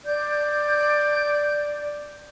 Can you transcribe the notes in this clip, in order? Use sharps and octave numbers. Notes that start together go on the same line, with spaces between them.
D5 G6